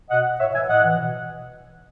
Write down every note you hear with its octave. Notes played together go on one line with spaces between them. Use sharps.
B2 D#5 F#5
A2 C#5 E5
E3 E5 G#5
A2 D#5 F#5
E3
B2